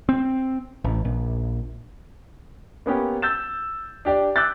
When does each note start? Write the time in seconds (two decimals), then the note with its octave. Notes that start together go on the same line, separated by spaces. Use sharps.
0.09 C4
0.84 A1
1.05 A#1
2.86 A#3 B3 C#4 G4
3.22 E6 G6 A6 E7
4.05 D4 G4 D5
4.36 D6 E6 F#6 G6 A6